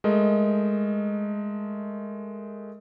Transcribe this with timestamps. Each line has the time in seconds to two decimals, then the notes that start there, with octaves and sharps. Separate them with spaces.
0.04 G#3 A3 A#4 D#5